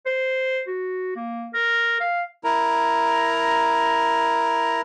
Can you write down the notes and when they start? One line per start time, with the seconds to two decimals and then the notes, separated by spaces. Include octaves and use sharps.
0.06 C5
0.67 F#4
1.16 A#3
1.54 A#4
2.00 F5
2.44 E4 A#4 A#5